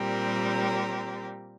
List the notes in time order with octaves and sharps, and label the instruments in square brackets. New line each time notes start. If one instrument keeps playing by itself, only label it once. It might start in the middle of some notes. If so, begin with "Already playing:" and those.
Already playing: [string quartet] A#2 G3 C4 G4 A#4